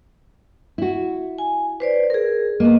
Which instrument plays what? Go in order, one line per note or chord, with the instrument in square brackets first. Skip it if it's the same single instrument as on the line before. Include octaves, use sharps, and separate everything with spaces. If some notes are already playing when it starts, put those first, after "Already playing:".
[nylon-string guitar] E4 F#4
[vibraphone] G#5
B4 C5 D5
G#4 A#4
[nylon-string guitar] A#3 B3 [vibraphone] D#5